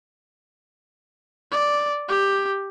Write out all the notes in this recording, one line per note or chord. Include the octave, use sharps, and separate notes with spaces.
D5
G4